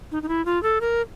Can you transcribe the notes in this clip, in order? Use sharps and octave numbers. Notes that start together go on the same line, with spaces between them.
D#4
D#4
E4
F4
A4
A#4